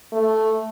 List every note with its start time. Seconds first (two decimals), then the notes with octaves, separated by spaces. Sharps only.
0.13 A3